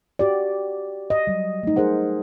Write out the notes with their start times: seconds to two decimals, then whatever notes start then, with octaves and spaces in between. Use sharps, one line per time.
0.19 F#4 G4 D5
1.10 D#5
1.27 F#3 G3
1.63 A3 D#4
1.76 G#4 A#4 C5 F#5